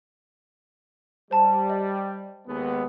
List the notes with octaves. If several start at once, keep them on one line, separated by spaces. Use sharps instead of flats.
G3 C5 A5
D#5
D#2 G#3 B3